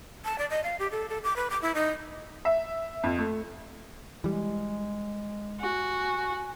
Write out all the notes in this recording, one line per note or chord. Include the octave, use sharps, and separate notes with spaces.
A5
D5
D#5
F5
G4
A4
A4
D6
B4
D6
E4
D#4
E5
F2
A3
E3 G3 G#3
F#4 G#5